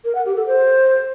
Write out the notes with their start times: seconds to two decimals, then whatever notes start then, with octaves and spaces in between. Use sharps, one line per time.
0.05 A#4
0.15 F#5
0.26 G4
0.36 A4
0.47 C5